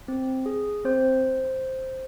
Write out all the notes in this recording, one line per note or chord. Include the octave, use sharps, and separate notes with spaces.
C4
G#4
C4 C5